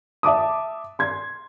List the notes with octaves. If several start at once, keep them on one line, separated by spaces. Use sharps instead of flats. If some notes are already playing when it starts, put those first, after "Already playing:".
E5 A5 D6 D#6
C6 G#6